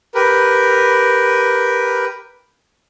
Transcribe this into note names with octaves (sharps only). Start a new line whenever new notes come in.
G4 A#4 B4